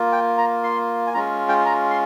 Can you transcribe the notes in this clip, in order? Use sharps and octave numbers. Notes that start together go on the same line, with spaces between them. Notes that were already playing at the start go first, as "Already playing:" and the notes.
Already playing: A#3 F4
G5
A#5
C6
G#5
G#3 C#4 F4 A#5
G5
A#5
C6